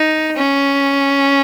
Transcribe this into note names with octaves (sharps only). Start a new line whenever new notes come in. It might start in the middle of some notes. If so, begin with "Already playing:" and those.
Already playing: D#4
C#4